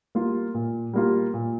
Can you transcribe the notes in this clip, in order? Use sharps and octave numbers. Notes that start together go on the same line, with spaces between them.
G3 A#3 F4
A#2
G3 A#3 F4
A#2